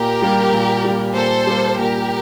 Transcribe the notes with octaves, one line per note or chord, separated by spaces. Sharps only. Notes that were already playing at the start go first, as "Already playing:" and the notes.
Already playing: A#2 G4 A#4
G3 A#3
A#2
G3 A#3
A#2 A4 C5
G3 A#3
A#2 G4 A#4